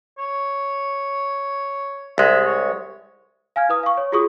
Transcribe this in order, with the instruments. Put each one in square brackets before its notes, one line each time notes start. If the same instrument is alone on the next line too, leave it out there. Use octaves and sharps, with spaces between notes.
[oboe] C#5
[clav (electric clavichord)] C2 G#3 [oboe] E5
[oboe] C#5
[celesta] F5 G#5 F6 G#6
E4 B4 D#6 F6
F5 C#6
C#5
F4 F#4 G#4 C#6 D#6